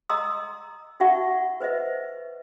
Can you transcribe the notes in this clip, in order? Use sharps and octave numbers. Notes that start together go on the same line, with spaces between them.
D#5 A#5 C6 D#6 E6
D#4 F#4 E5 F#5 C#6
B4 C5 D#5 E5